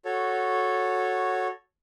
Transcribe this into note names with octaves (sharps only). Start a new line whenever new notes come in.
F#4 A4 C#5